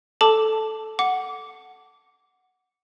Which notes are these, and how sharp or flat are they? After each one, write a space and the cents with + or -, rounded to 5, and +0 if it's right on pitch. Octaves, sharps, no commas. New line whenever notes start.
A4 -5 A5 +0 D6 +0
F#5 +0 D6 -20